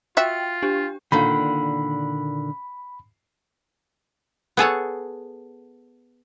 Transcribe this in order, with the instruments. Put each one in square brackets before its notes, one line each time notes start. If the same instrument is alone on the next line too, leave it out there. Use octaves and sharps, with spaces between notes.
[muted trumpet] F4 [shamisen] F#4 E5 [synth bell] G5
[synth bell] D4 G4
[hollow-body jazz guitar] A#2 D3 D#3 [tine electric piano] B5
[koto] B3 G#4 A4 C#5